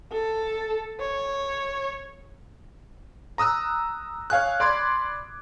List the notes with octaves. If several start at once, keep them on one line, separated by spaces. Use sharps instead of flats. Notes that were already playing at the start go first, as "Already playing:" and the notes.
A4
C#5
A#5 D#6 E6 F#6
C#5 F5 G#5 F#6
D5 B5 C6 D6 G#6